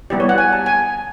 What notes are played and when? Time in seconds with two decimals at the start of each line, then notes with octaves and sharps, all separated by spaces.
0.10 G3 B3 E4 G4 D5
0.20 C#5
0.29 F#5
0.38 G#5
0.53 A5
0.66 G#5